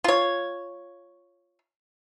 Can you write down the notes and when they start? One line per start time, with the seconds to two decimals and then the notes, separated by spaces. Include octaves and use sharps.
0.04 F4 C#5